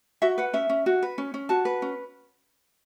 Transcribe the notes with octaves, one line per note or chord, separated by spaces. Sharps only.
F#4 E5
B4 F#5
C#4 E5
C#4
F#4
B4
C#4
C#4
F#4 A5
B4
C#4